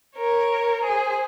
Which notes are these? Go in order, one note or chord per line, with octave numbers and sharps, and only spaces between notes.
A#4 C#5
G#4 C5